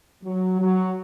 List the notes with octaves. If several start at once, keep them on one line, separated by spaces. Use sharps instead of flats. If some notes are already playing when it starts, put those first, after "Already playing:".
F#3
F#3